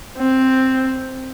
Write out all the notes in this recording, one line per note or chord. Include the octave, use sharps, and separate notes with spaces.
C4